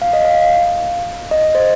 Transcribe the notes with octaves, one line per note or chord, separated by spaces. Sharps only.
F5
D#5
F5
D#5
D#5
C5